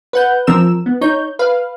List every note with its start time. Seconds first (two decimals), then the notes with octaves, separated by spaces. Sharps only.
0.13 B4 F#5 G6
0.47 F3 C4 A#4 E6 E7
0.86 B3
1.01 D#4 C#5 G6
1.39 B4 F5